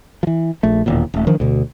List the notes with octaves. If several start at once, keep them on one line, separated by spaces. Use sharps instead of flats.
E3 F3
A#1 A3
E1 D#2 A#2
D#1 A3
D#3 F3 D4
D2 B2